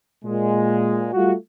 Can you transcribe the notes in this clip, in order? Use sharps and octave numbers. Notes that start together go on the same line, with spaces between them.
A#2 G#3
G3 A3 F4 F#4